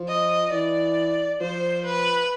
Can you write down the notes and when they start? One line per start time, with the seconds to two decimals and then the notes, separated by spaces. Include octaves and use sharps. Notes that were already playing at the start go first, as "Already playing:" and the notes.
Already playing: F3
0.08 D#5
0.52 E3 D5
1.40 F3 C5
1.85 B4